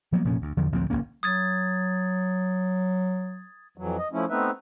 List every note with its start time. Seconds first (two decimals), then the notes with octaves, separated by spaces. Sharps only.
0.12 F3 F#3 A#3 B3
0.25 F1 A#2 F3 C#4
0.42 D2
0.57 E2 D3 F3
0.72 A1 D2 F3 C4
0.90 F#1 B2 A#3 C#4
1.23 F#3 D#6 G#6 A6
3.78 F2 E3 F#3
3.98 D#5
4.12 F3 A3 C#4 E4
4.30 A3 B3 C4 D#4 B4 E5